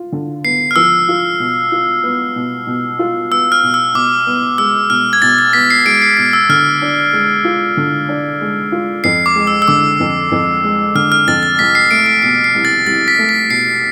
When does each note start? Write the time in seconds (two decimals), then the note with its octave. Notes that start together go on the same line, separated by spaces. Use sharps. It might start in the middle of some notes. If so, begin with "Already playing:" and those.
Already playing: F4
0.12 D3
0.44 B3 C7
0.71 F6
0.76 F3 E6
1.09 F4
1.40 B2
1.72 F4
2.04 B3
2.36 B2
2.67 B2
2.99 F4
3.31 B3 E6
3.52 F6
3.63 B2
3.74 E6
3.94 B2 D6
4.27 B3
4.58 G#3 E6
4.90 B2 F6
5.13 G#6
5.22 B2 A6
5.39 A6
5.53 B3 B6
5.70 C7
5.85 G#3 D7
6.02 C7
6.17 B2 B6
6.33 E6
6.49 D3 F6
6.82 D4
7.13 G#3
7.45 F4
7.77 D3
8.09 D4
8.41 G#3
8.72 F4
9.04 F2 C7
9.26 D6
9.36 G#3
9.47 E6
9.62 E6
9.68 D3 D6
10.00 F2
10.32 F2
10.64 G#3
10.95 D3 F6
11.12 F6
11.27 F2 A6
11.43 A6
11.59 C2 B6
11.75 C7
11.91 A3 D7
12.06 D7
12.22 B2 C7
12.44 C7
12.55 C2
12.65 A6
12.86 C2 A6
13.08 B6
13.19 A3
13.29 B6
13.50 B2 C7